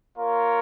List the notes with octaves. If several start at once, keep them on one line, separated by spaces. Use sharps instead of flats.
A#3 F4 A#4 C#5